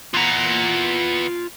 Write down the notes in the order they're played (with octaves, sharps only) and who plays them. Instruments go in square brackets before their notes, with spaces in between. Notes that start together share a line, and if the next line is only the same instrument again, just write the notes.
[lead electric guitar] E3 B3 [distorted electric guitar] F4 A#5